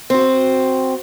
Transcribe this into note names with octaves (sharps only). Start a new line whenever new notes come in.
C4 F#4